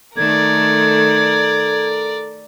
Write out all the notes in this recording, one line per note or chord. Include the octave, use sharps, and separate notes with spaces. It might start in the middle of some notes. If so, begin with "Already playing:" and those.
D#3 A3 A4 A#4 D5 G#6